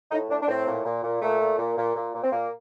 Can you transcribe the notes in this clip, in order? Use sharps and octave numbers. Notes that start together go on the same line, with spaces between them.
A2 D#4
A2 D4
D4
A2 C4
A#2
A#2
A#2
A#2 A3
A#2
A#2
A#2
A#2
A#2
C4
A#2 A#3